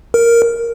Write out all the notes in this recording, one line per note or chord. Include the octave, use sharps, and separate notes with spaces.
A#4